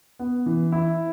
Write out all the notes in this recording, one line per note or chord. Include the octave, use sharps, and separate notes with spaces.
B3
E3
E4